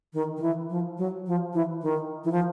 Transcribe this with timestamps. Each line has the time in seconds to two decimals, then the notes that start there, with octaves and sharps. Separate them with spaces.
0.13 D#3
0.37 D#3
0.42 E3
0.70 F3
0.98 F#3
1.26 F3
1.53 E3
1.82 D#3
2.24 E3
2.32 F3